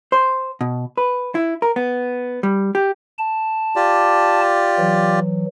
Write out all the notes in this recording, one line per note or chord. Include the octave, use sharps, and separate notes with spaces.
C5
B2
B4
E4
A#4
B3
G3
G4
A5
F4 G4 D5
E3 F#3